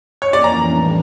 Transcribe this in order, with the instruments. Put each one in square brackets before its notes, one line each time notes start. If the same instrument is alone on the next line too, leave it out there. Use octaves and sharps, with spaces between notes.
[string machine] F2 E3 A#3 C#4 [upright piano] C#5
[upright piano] D5
A#5
[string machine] A2 E3 G3 D4